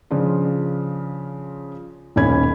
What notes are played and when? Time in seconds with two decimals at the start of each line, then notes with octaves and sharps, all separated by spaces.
0.11 C#3 F3 D4 F4
2.16 D#1 B1 C#4 B5 G#6